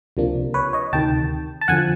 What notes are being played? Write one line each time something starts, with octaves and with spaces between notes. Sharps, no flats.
C#2 C3 F3 A#3 D4
B4 C#5
C#5 D#5
D2 C3 D#3 G5 A5
A5
F2 D3 F3 F#5 G#5